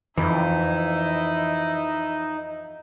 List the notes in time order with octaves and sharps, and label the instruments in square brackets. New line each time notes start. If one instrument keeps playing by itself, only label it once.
[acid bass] F2 [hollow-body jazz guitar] E3 [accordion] D#4 [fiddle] E4 D#5